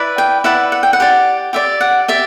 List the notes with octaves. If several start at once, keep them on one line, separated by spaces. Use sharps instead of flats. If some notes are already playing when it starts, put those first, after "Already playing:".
Already playing: E4 B4 D5
G5
E4 B4 D5 F#5
F#5
G5
F#5
G4 D5
G4 D5 E5
F#5
G4 D5 E5